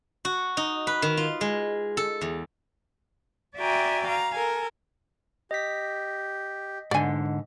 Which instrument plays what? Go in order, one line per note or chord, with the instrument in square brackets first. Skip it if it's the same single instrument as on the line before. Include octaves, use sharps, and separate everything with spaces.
[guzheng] F#4
D#4
B4
D#3
F4
G#3
A4
E2
[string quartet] F#4 D5 E5 G5 G#5 A#5
F5 A#5
A4 A#4 G#5
[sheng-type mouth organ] G4 [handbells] D#5 B6
[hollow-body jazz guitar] G#2 D3 [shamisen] D5 G#5